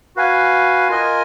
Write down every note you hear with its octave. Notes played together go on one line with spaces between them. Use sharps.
F#4 B4 F5 G#5
F4 A#4 D#5 G#5